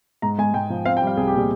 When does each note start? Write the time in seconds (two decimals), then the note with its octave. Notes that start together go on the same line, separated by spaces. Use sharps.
0.22 G#2 A#5
0.38 G#3 G#5
0.54 G#2 G5
0.70 F3
0.85 C4 F5
0.97 G5
1.02 G3
1.07 F5
1.17 C2 G#4
1.27 G4
1.33 A#2
1.38 G#4